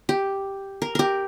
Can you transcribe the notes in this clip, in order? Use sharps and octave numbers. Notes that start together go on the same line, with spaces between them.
G4
A#4
G4 A#4